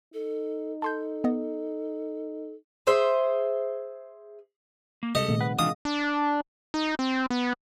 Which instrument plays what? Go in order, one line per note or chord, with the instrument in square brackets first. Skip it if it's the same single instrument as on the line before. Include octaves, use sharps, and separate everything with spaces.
[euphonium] D#4 [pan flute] A4
[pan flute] A4 [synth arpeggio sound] A5 C6 G6
[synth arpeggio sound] B3 D#5
[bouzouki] G#4 C5 E5
[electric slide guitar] A#3
[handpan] C3 G3 G#3 [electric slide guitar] G4 A4 [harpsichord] D#5
[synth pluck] A#2 A3 [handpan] D#3 C4
[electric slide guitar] B4 [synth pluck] F#5
[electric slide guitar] E3 D4 F4 [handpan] G#3 D#5 [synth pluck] F5 [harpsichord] D#6
[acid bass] D4
D#4
C4
B3